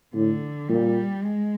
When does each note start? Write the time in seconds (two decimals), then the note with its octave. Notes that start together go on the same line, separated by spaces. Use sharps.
0.14 A2 D3
0.69 A#2 G3
1.24 G#3